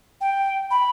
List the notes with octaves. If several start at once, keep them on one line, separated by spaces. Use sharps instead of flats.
G5
B5